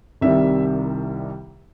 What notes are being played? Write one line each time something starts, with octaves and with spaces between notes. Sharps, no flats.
C2 C3 D#3 G3 E5